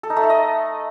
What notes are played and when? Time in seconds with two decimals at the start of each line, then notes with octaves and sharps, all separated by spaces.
0.03 A4
0.10 D#4
0.16 A3
0.23 A4
0.30 D#5